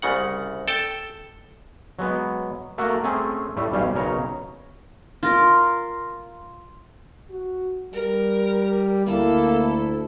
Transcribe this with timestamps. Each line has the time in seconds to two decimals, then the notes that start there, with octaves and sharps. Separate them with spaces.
0.02 C2 C#3 F#5
0.68 A4 G5 A5
1.99 F#3 G#3 B3
2.78 A3 A#3 F#4 A#4
3.04 A3 C4 C#4 G#4
3.57 A2 G3 A3
3.72 B1 G3 C#4 F5
3.94 B1 C#3 A#4 C#5 A#5
5.23 F4 A#4
7.30 F#4
7.93 G3 A#4
9.07 D2 A#3 E4 A4